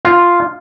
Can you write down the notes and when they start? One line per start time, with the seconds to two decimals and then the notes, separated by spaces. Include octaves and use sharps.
0.05 F4